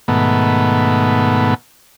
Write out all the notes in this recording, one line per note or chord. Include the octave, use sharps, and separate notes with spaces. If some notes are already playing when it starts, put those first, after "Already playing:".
G#2 B2 D#3 A3 B3